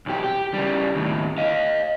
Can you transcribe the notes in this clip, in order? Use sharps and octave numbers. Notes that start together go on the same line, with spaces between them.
B1 G4
G4
C#3 G3
D#2 A2
D#5 F5